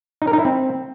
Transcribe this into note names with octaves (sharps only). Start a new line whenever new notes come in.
D#4
A#4
D#4
E4
C4